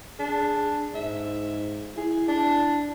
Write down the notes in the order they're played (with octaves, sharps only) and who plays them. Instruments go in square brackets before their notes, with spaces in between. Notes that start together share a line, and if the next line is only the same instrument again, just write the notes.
[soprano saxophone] D4 [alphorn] G#4
[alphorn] G#2 [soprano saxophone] E5
[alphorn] E4 [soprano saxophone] G#4
[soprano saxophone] D4